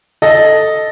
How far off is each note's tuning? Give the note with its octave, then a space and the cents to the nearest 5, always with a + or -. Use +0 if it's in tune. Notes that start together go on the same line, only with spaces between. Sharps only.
A4 +0 D#5 +0